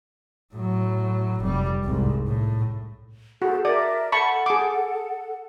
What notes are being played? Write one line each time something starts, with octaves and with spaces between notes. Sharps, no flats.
A2 F#3
F1 G3
C2 G#2
A2
F#4 G#4 A4 C5
A#4 D5 E5
A4 F#5 A5 B5 C#6
G#4 D6